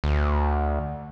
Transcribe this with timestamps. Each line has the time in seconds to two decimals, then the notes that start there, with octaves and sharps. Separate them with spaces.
0.04 D2